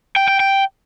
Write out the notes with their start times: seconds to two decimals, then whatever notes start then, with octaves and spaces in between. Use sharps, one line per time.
0.16 G5
0.28 G5
0.40 G5